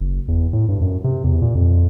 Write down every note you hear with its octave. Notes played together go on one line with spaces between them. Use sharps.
F#1
E2
A2
G2
F#2
C3
E2
A#2
F2